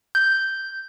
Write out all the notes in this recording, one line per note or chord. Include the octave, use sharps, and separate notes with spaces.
G6